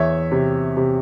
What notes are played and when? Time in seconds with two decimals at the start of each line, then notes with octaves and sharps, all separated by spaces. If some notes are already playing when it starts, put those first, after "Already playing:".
Already playing: E2 C#5 E5
0.32 C3
0.77 C3